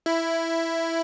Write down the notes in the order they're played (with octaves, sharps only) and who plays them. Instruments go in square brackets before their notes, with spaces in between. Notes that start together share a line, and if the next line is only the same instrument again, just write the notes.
[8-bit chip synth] E4